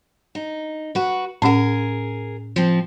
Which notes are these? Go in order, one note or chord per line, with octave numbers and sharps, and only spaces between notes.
D#4
F#4 B4
A2 C#4 G#4 A#4 F#5
F3 C4